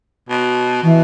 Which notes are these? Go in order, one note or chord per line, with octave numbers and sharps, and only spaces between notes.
B2
B2 E3